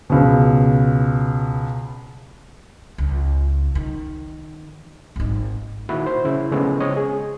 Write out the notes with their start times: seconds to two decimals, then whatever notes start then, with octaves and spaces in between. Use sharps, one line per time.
0.10 C#2 B2
2.98 C#2
3.75 D#3
5.16 G#1 D#4
5.89 A#2 D#3 E4 F#4 B5
6.06 C5
6.25 C#3 E4
6.51 C#3 F3 G#3 A3 B3 C#4
6.80 C4 C#5 D#5
6.97 G#4